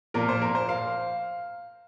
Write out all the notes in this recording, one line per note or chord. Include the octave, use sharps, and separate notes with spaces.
A#2 F3 A#3 A#4
C5
A#4
C5
F5